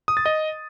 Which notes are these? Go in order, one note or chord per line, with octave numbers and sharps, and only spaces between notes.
D#6
A6
D#5